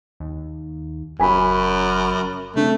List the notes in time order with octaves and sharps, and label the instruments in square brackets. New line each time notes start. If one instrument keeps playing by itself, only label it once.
[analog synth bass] D#2
[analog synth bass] F#1 [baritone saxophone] F#2 [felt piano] G#5 B5
[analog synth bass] C#3 [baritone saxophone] A3 [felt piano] C4 D4